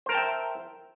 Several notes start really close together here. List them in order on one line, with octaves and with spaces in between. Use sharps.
C5 A#4 A5 G5 E5